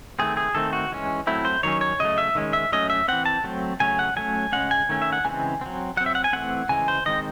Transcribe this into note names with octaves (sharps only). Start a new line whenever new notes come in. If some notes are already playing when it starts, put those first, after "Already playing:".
D#3 A3 C4 G#4
G#4
D#3 A3 C4 A4
F#4
E3 G#3 C#4
F#3 A3 C4 E4
C5
D#3 F#3 C#4 C#5
C#5
C#3 F#3 A3 D#5
E5
D#3 G#3 C#4
E5
F#3 A3 C#4 D#5
E5
E3 C4 F#5
A5
F#3 A3 C4
C#3 F#3 A3 C#4 G#5
F#5
F#3 A3 C#4 G#5
C#3 G#3 C#4 F#5
G#5
D#3 A3 C#4
E5
F#5
C#3 E3 G#3 C4 G#5
F#3 C4
F#3 C4 F#5
E5
F#5
G#5
E3 A3 C4 F#5
C#3 E3 G#3 G#5
C5
D#3 G#3 C4 D#5